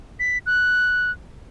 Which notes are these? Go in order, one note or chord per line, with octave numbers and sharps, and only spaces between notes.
B6
F#6